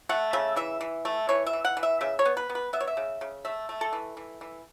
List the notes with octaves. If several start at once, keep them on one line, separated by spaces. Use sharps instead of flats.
A3 F#5
C#3 E5
E3 E5
E3
A3
E3 C#5
E5
E3
F#5
E3
E5
C#3 E5
C#5
B3
B4
B3
B4
B3 E5
C#5
E5
C#3
C#3
A3 E5
A3
A4
E3
E3
E3